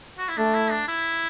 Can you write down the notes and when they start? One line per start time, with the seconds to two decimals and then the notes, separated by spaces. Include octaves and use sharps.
0.18 F#4
0.28 E4
0.37 A3 D4
0.54 E4
0.71 D4
0.88 E4